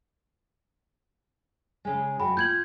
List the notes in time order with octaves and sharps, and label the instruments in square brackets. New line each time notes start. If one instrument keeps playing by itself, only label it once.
[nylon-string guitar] C#3 G#3
[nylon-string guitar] F#2 F#4 G5 [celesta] B5
[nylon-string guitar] F4 [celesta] G6 G#6 F#7